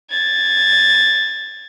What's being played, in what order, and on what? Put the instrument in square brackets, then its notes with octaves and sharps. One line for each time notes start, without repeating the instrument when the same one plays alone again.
[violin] G#6 A6